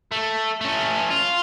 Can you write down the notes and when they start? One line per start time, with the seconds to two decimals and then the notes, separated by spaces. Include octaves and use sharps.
0.12 A3
0.61 A3 C#4
1.11 F4